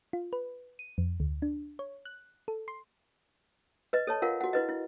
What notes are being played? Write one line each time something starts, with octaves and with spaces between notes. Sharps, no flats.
F4
B4
D#7
F2
D2
D4
C#5
F#6
A4
C6
B4 D#5
A4 C#5 A5
F4 A#4 F5 F#5
F#4 F#5
E4 B4 D#5
E4